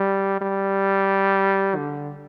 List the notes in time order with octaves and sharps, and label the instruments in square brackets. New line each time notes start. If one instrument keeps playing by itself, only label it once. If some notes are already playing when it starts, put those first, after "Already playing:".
Already playing: [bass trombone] G3
G3
D3